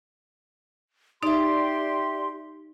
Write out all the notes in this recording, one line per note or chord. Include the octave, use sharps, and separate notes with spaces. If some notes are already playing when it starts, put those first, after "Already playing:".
D#4 G4 D5 E5 C6